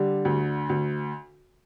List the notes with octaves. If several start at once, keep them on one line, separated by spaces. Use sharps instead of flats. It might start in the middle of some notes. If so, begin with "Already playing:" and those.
Already playing: D3 G3
D2
D2